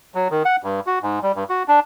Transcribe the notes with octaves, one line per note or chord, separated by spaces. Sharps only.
F#3
D#3
F#5
G2
F#4
G#2
G3
G2
F#4
D4